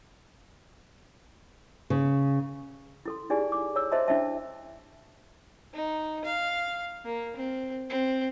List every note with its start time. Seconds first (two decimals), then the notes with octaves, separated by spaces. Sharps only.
1.90 C#3
3.06 E4 A4 C6
3.30 D#4 E4 G4 G#4 D5 G#5
3.52 D6
3.76 C#5 A#5 E6
3.91 C5 D#5 E5 A5 A#5 C6
4.08 D4 E4 C5 D#5 E5 A5
5.73 D#4
6.24 F5
7.05 A#3
7.36 C4
7.90 C4